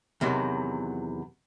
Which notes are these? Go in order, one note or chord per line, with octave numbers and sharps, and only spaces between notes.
E2 C3 D#3 F#3